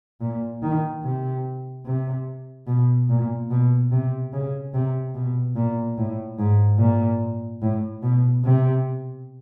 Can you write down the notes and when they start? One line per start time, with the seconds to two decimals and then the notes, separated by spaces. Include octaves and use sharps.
0.21 A#2
0.62 D#3
1.04 C3
1.86 C3
2.67 B2
3.10 A#2
3.51 B2
3.91 C3
4.33 C#3
4.74 C3
5.15 B2
5.56 A#2
5.98 A2
6.39 G#2
6.79 A#2
7.62 A2
8.03 B2
8.45 C3